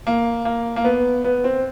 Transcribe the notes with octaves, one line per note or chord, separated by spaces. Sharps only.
A#3
A#3
A#3
B3
B3
C4